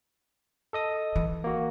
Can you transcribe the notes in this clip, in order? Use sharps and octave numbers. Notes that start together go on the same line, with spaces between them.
A4 D#5 D#6
E3
A#3 F#4